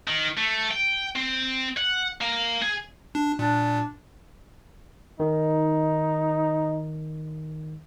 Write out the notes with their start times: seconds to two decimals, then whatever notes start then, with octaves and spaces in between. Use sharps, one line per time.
0.08 D#3
0.38 A3
0.71 G5
1.16 C4
1.77 F#5
2.21 A#3
2.62 G#4
3.15 D4
3.39 A#2 D4
5.20 D#3 D#4